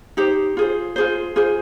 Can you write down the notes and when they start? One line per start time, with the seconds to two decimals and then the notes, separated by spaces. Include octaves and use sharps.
0.17 D#4 G4 C5
0.57 F4 G#4 C5
0.96 F4 G#4 C5
1.36 F4 G#4 C5